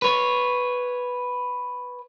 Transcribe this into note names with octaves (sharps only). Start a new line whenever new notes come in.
B4 C#5